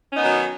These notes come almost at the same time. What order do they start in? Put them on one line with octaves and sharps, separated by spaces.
C#4 D#4 B3 D#3 F#3